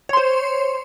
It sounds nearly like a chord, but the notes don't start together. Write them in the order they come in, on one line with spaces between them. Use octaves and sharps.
C#5 C6 C5